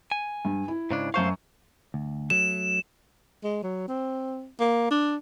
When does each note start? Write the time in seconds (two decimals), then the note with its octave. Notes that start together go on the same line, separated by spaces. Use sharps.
0.11 G#5
0.45 G2
0.68 E4
0.91 G#2 C#3 D4
1.14 F#2 A3 C5 F5 C#6
1.94 D2
2.30 F#3 A3 E7
3.44 G#3
3.63 F#3
3.88 C4
4.60 A#3
4.91 D4